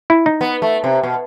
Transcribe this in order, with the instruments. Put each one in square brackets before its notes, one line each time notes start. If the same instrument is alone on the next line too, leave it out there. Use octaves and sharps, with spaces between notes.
[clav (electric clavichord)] E4
D#4
[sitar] B3
A3
C3
B2